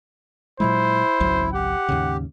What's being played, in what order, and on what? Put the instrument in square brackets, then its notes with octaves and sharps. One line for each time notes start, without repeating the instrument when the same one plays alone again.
[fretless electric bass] A#2 F#3 G#3 [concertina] E4 [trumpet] C5
[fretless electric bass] G#1 C#2 F#3
[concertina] G4 [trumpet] F#5
[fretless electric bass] D#2 G#2 C#3